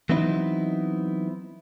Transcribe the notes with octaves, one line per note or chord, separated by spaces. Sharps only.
E3 F#3 B3 C4 D#4 E4